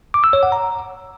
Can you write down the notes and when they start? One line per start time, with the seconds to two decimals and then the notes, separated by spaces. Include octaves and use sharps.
0.14 D6
0.24 E6
0.33 C#5
0.43 F#5
0.52 A#5